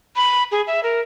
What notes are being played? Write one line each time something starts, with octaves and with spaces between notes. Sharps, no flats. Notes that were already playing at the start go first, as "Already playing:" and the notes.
B5
G#4
E5
A#4